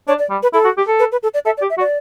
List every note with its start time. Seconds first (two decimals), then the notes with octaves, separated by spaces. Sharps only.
0.08 D4 C#5
0.19 D5
0.30 G3
0.43 B4
0.53 E4 A4
0.65 F#4
0.77 G4
0.88 A4
0.99 B4
1.12 B4
1.23 A4
1.34 D5
1.46 A4 E5
1.57 D5
1.62 G4
1.70 E5
1.78 F#4
1.80 D5